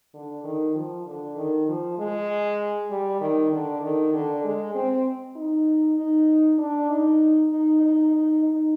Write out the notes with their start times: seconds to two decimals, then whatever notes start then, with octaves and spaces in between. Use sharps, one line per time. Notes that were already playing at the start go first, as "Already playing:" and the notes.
0.14 D3
0.44 D#3
0.75 F3
1.06 D3
1.37 D#3
1.68 F3
1.98 G#3
2.90 G3
3.21 D#3
3.52 D3
3.82 D#3
4.14 D3
4.44 G#3
4.75 C4
5.36 D#4
5.97 D#4
6.59 D4
6.90 D#4
7.51 D#4
7.82 D#4
8.12 D#4
8.44 D#4